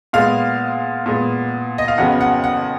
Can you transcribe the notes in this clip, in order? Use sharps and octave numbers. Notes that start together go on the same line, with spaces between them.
A#2 G#3 B3 F5
A#2 G#3 B3
D#5
F5
F2 C#3 F#3 B3 F#5
F#5
F#5